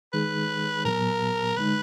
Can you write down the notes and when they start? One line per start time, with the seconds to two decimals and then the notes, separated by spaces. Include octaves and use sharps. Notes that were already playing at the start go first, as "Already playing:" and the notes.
0.13 D#3 G#3 D#4 G#4 B4
0.85 A#2 F#3 B3 A#4
1.57 D3 G#3 D#4 B4